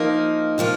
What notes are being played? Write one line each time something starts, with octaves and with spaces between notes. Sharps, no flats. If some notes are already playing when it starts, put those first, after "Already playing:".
Already playing: F3 A#3 D#4
C3 F3 A#3 F4